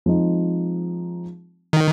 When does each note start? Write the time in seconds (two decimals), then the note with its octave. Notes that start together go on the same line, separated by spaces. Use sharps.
0.06 F3 G#3 C4 D#4
1.73 D#3